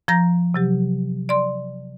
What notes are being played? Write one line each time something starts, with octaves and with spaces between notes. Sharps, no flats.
F3 A#5 G6 A#6
C3 F#3 G4
D5 C6